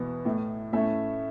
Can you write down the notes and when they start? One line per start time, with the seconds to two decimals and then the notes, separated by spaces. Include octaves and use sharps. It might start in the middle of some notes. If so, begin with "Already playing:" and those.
Already playing: E2 B2 B3
0.25 A2 A3 E4
0.72 A2 A3 C#4 E4 E5